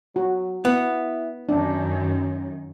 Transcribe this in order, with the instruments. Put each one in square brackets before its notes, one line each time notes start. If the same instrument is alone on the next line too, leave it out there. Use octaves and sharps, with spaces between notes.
[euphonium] F#3 [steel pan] F#4
[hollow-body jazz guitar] B3 [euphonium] E4 [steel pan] F#5
[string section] F#2 D#3 [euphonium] C#4 [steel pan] D4